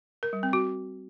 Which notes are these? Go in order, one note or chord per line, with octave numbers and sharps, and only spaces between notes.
A#4
G3
C4
F#4